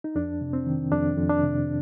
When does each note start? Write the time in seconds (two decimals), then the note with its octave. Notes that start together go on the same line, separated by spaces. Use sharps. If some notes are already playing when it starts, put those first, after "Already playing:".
0.04 D#4
0.15 F2 D4
0.41 C3
0.53 C4
0.66 D#3
0.92 F2 D4
1.17 F2
1.29 D4
1.43 C3